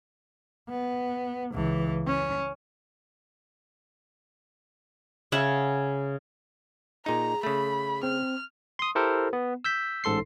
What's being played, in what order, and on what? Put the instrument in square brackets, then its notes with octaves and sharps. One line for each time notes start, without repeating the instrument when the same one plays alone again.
[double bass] B3
C#2 E3
C#4
[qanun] C#3 E5 F#5
[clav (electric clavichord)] A#2 D#4 [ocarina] G#4 [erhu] A#5
[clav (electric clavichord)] C#3 A3 [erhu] B5
[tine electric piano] C4 [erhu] F6
[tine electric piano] C6 D#6
E4 G4 A4 A#4 C5
B3
E6 G6 B6
A1 G#2 A4 C6 C7